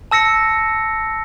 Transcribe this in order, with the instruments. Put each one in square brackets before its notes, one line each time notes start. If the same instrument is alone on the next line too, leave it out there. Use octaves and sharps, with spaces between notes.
[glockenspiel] A5 E6 A#6 C#7